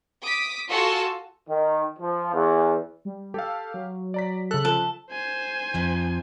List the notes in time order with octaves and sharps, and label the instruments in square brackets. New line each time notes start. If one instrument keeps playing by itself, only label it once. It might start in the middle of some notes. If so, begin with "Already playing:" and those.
[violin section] D6 D#6 B6
F4 F#4 A4 G#5 A5
[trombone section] D#3
F3
E2
[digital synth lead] G3
[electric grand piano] G4 F5 [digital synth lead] A4
[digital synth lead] F#3
[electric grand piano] D5 A#5 B6
[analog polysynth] C#3 F#6 [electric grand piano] A4
[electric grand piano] F3 [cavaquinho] A4
[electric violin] C5 G#5
[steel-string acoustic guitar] F2 F3